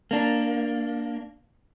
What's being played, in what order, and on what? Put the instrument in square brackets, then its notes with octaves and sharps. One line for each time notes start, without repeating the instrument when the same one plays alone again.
[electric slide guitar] A#3 D4